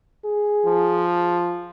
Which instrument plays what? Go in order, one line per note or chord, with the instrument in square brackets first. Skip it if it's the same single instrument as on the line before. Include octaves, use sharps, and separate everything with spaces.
[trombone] G#4
[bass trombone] F3